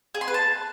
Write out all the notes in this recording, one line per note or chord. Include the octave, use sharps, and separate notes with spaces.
G#4
C6
B4
A5